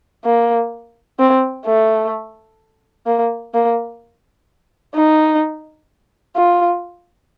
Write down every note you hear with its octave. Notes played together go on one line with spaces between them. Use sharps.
A#3
C4
A3
A#3
A#3
D#4
F4